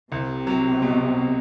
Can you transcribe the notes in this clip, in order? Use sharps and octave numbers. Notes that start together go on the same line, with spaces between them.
C2 C3
F#3
B2